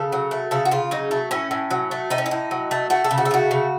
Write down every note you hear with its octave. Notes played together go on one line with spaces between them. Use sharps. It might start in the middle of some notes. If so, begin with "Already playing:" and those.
Already playing: C#3 A4
F#3
A3
C#3 A4
F#4
C#3 F4
F#3 D#4
A3
A2 C#4
A2
F#3
A3
A2 D#4
C#4
D#4
A2
F#3
A3
A3 F#4
A4
C#3
F#4
A4
A3 F#4
C#3